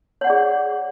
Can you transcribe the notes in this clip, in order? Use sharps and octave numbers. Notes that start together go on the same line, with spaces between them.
G#4 C#5 D5 F#5